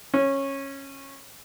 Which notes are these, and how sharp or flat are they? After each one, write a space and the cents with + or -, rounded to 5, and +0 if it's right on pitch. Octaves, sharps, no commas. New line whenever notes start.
C#4 -15